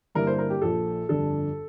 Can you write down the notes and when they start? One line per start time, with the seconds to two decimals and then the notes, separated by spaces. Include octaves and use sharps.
0.15 G2 D3 G3 A#3 E4 A#4
0.27 C5
0.39 A#4
0.50 G4
0.62 A#1 A#2 F3 A4
1.09 G1 F2 D3 G3 D4 A4